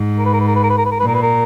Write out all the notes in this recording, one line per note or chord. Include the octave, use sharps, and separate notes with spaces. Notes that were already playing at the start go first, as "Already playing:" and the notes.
Already playing: G#2
A#4
B4
A#4
B4
A#4
B4
A#4
B4
A#4
B4
A#4
A#2 B4
A#4
B4
A#4